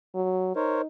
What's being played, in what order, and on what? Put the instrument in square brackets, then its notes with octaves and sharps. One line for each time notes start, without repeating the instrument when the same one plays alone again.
[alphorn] F#3
[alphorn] D#4 [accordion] A#4 C5 C#5